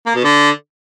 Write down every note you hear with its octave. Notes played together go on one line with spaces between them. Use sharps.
A#3
B2
D3